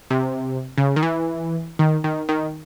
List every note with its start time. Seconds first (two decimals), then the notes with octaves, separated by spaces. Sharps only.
0.10 C3
0.78 C#3
0.96 D#3
1.03 E3
1.79 D#3
2.04 D#3
2.29 D#3